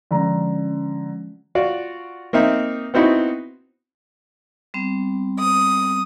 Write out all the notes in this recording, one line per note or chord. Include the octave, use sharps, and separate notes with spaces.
D3 F3 G#3 C#4 A#5
F4 F#4 D5
A#3 C4 D#4 E5
B3 C4 D#4 E4 F#4
G3 B3 C4
D#6